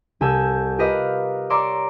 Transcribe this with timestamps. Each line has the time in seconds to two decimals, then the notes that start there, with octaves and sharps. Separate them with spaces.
0.21 C2 A4 G#5 E6 G6
0.78 F4 G4 A#4 B4 D#5 F5
1.50 C#5 D5 A#5 C6 D6 E6